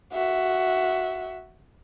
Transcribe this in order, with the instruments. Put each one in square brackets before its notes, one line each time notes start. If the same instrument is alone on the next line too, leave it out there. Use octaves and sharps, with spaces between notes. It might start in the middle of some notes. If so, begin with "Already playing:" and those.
[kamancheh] F#4 E5